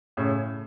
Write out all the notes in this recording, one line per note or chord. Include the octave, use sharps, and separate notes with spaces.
A2 C#3